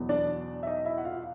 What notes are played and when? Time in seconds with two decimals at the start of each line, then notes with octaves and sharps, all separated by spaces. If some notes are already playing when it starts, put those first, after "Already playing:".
Already playing: E2 B2 F#3 B3
0.09 D4 D5
0.63 E5
0.66 D#4 D#5
0.85 E4 E5
0.98 F#5
1.05 F4 F5